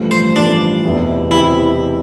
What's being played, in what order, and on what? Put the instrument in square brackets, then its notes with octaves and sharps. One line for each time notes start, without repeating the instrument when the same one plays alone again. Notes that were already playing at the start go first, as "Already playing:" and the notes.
Already playing: [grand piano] A1 G2 F3 A3
[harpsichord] C5
[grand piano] A1 G2 F3 A3 [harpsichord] D4
[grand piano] E1 E2 C3 E3
[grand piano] C3 E3 [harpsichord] E4